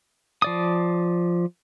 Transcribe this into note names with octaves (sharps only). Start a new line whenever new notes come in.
F3 D5 D#6